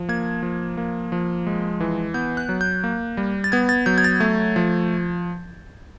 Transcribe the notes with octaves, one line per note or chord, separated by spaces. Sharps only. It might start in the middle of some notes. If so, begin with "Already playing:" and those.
Already playing: F3
A#3 G#6
F3
A#3
F3
G#3
E3
B3 G6
F#6
F#3
G6
A#3
G3
A6
B3 G#6
A6
F#3 G6
G#6
A6
A3
F3